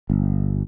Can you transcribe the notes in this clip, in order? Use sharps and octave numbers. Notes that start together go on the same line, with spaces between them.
G1